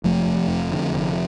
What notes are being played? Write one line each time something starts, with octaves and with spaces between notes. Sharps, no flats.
F1 F3 A3
F1
F2
D3
F1